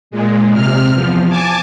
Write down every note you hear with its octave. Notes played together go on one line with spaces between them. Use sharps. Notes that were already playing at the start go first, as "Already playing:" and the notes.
A#2 G#3
C3 F6
E2 F3
G#5 A5 D6